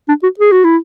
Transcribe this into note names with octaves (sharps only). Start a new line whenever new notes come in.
D4
F#4
G#4
F#4
E4